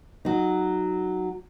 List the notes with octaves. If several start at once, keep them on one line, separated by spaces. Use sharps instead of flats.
F#3 D#4